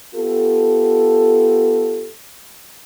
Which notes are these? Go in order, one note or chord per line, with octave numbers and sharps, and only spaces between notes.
B3 F4 G4 A4